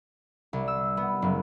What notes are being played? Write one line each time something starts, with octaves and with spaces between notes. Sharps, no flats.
C2
E6
B3
F#1